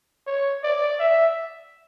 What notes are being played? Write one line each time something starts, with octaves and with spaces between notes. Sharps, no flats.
C#5
D5
E5